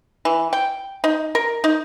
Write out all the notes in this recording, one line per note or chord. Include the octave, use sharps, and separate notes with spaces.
E3
G5
D#4
A#4
D#4